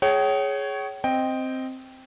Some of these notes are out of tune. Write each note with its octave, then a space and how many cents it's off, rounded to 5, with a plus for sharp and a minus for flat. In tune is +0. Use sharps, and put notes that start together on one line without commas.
G#4 +10 C#5 +0 G5 -45
C4 +0 D#5 +0 G5 +0